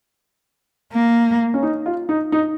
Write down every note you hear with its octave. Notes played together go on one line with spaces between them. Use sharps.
A#3
C#4
D#4
F4
D#4
D#4